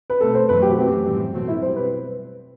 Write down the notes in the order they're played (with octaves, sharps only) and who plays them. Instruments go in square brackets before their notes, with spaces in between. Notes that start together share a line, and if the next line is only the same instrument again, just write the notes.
[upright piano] B4
[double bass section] B2 A3 C4 [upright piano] A4
[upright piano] C5
[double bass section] F#2 E3 A3 C4 [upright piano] B4
[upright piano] G4
F#4
[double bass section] F#2 E3 A3 C4 [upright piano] G4
[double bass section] A2 E3 G3 C4
[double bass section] B2 F#3 A3 C4 [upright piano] F#4
[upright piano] E4
[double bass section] B2 G3 C4 [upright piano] C5
[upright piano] B4